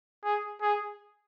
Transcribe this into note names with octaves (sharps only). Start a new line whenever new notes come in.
G#4
G#4